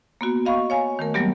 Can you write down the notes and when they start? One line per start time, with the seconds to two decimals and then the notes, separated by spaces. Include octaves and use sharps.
0.21 A#3 B3 F#4
0.46 D#5 F5 B5 C#6
0.70 C#5 F5 G#5
0.99 D#3 A3 A#4
1.14 F#3 G3 A#3 B3 G4